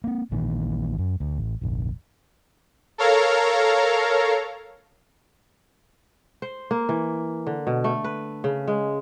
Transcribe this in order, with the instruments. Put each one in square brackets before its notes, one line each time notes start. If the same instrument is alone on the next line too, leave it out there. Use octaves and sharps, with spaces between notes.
[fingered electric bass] A#3 C4
A#1 A#2 D#3 E3
F#2
D2
A1
F1 A#1
[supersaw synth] A4 A#4 C#5 F5 A#5
[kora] C5
A#3
E3
D3
B2
A3
B4
C#3
G#3